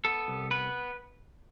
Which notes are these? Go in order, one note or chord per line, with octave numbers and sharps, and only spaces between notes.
B3 A4
C2
B3 B4